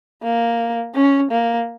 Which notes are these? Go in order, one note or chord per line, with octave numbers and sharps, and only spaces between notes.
A#3
C#4
A#3